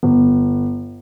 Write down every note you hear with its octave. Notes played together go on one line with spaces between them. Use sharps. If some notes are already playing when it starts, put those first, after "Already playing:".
G1